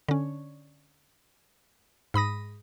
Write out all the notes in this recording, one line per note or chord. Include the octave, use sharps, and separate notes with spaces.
D3 C#4
G#2 B5 D#6 A#6